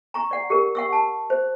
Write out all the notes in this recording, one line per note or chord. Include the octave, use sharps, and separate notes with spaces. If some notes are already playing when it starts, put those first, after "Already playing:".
A#5 C#6
D5 F#5
G4 A#4
F#5 C#6 E6
A5
C5